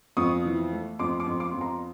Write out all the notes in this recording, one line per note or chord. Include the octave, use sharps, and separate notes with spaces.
F2 C#6 D#6
E3
A3
F2 C6 D6
C6 D6
F2
C6 D6
F2
A#5 C6